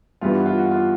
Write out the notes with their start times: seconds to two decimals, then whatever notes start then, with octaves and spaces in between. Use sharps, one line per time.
0.21 G2 E3 G3 B3 F4
0.34 F#4
0.46 F4
0.58 F#4
0.71 F4